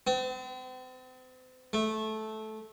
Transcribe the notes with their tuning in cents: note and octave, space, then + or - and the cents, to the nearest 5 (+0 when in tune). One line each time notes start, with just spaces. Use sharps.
C4 -40
A3 -15